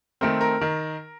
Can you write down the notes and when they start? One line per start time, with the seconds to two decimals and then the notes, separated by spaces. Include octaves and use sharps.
0.21 D#3 A3 C4 A#4
0.41 A#4
0.61 D#3